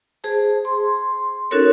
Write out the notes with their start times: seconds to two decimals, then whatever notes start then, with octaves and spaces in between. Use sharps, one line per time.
0.24 G#4 C5 A5
0.65 C6
1.51 C#4 D#4 F#4 A4 A#4 C#5